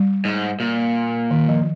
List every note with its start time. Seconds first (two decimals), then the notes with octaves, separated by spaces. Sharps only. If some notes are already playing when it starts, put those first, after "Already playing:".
Already playing: G3
0.25 G#2
0.60 A#2
1.31 D#3
1.49 F3